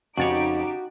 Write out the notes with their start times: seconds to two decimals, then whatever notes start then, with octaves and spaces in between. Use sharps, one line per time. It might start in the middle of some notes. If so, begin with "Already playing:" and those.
0.18 F2 C#3 D#4 F#4 G4 C#5 A6 D7